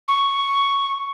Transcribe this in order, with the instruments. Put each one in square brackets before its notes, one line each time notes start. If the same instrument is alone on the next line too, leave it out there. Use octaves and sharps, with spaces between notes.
[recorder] C#6